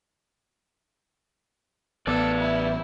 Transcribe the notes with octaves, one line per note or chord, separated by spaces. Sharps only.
A1 B3 A4 B4 D5
E4